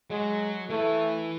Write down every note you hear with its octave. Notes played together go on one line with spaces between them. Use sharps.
F#3 G#3
E3 A3